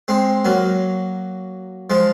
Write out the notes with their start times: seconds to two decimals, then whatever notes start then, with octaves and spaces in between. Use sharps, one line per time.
0.08 G#3 C4
0.45 F#3 A#3
1.90 F3 G#3